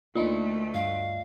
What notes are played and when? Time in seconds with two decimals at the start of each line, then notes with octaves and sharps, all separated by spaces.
0.15 D2 A3 A#3 D4 D#4 F4 D5 D#5
0.74 G2 F5